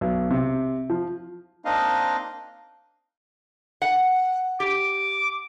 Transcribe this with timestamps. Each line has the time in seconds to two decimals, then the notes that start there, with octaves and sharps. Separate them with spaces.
0.01 B1
0.30 C3
0.90 F3
1.65 A#3 C4 D4 D#4 D#5 F5
3.82 F#5
4.60 G4 D6